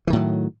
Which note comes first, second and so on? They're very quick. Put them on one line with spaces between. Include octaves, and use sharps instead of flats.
E3 D#3 A2 F#3